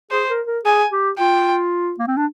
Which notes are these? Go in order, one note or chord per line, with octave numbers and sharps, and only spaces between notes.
G#4 C5
A#4
A#4
G#4 G#5
G4
F4 G5
A#3
C4
D4